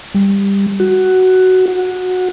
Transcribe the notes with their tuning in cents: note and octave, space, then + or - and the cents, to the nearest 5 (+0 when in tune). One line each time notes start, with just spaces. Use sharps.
G3 +15
F#4 +10
F#4 -15